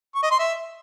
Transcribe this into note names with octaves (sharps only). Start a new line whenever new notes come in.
C#6
D#5
C6
E5